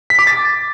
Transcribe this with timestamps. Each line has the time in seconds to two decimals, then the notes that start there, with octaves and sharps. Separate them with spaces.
0.10 B6
0.19 D6
0.27 A6